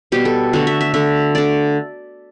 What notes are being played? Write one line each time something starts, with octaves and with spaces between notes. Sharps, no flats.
B2 G3 B3 G4
A4
D3 A3 F#4
E5
E5
D3 A3 E5
D3 A3 D5